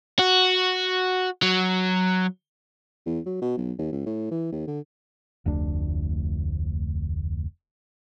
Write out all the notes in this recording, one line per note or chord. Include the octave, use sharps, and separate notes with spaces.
F#4
F#3
E2
F#3
B2
B1
D#2
C#2
A2
E3
D#2
D3
F1 D2 D4